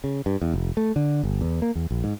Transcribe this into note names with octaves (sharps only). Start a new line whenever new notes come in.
C#3
G2
E2
F1
A3
D3
G1
E2
A#3
E2
A#1
G#2